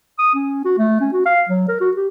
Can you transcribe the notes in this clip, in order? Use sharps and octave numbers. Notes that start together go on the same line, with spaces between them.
D#6
C#4
F#4
A3
C#4
F#4
F5
F#3
A#4
F#4
G4